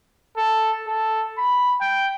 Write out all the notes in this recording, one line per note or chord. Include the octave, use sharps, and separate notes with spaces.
A4
A4
B5
G5